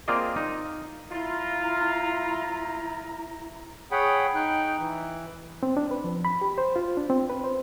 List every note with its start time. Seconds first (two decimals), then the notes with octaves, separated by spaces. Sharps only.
0.08 A#3 C4 F4 G#4 D5 D#5
0.36 D#4
1.11 E4 F4 A#5
3.92 G#4 C#5 F#5 G5 B5
4.35 D#4 G5 F#6
4.79 E3
5.63 C4
5.77 D4
5.91 B4
6.04 F3
6.25 B5
6.41 G4
6.58 C5
6.76 F4
6.97 D4
7.10 C4
7.30 B4
7.44 C5